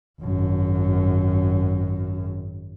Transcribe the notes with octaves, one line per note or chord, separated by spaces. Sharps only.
G#1 F#2